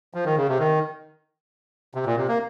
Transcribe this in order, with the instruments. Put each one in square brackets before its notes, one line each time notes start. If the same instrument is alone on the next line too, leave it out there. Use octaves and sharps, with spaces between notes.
[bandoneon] F3
D#3
C#3
C3
D#3
C3
A#2
C3
A#3